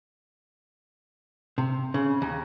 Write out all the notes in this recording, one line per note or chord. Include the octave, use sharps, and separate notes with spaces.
C3
C#3
D#2